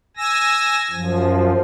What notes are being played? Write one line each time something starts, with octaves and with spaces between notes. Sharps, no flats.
G#5 E6 A#6
F#2 F3